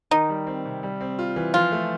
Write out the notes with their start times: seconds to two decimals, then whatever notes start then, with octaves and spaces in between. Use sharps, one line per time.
0.11 D#3 D#4
0.29 G3
0.47 C4
0.65 C3
0.83 G3
1.01 C4
1.19 F4
1.36 E3
1.54 F3 F4
1.72 A3